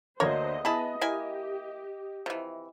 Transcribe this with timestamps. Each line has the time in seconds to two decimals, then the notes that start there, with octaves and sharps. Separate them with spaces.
0.20 D2 D3 A#3 A#4 C5 C#5 D#5
0.65 B3 E4 G#4 D#5 A5 B5 D#6
1.01 A#3 E4 G4 G#5
2.26 C3 E3 F3